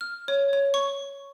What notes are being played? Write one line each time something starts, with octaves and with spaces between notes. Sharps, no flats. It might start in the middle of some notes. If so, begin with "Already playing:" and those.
F6
C#5
C#5
C#6